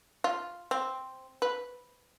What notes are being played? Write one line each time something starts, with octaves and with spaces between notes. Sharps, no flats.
F4
C4
B4